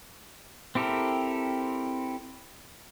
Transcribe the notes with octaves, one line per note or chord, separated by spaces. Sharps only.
C4 E4 G4 A4 A#4